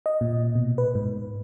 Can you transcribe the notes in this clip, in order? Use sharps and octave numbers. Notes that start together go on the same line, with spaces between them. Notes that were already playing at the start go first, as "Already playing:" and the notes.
D#5
A#2
B2
B4
G#2